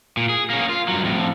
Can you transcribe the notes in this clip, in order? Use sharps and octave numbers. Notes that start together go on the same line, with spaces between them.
A#2
G#4
A#3 C#4
F4
G2 F#3
F2 A2